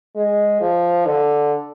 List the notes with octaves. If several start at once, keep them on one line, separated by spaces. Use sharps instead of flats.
G#3
F3
D3